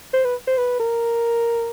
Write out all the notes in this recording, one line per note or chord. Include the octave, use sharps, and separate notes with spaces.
C5
B4
C5
B4
A#4